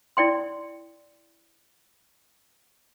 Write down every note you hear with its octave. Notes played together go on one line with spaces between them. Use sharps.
E4 D5 G5 C6